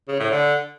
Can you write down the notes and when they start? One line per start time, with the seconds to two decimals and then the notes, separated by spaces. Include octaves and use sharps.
0.08 C#3
0.19 A2
0.31 D3